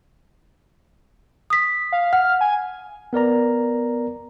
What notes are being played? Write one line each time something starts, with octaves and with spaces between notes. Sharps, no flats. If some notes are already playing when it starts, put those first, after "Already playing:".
D#6 B6
F5
F#5 F6
G#5
B3 A#4 D5 A#5